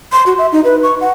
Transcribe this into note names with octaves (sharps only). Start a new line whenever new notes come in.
C6
F#4
E5
D#4
B4
C#6
F#5